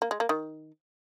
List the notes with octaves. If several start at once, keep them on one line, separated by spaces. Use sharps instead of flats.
A#3
G#3
A#3
D#3